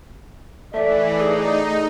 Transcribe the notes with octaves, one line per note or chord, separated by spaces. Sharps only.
A2 E3 A3 D5 E5
D#4 G#4